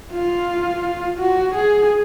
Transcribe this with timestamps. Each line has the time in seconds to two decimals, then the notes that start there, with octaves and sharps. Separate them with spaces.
0.12 F4
1.19 F#4
1.54 G#4